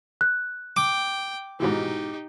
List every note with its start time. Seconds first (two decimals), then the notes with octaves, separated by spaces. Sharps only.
0.21 F#6
0.77 G5 D6
1.60 G#2 B2 E3 D#4 G4